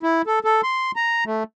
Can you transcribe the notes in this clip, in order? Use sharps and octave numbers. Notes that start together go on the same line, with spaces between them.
E4
A4
A4
C6
A#5
A3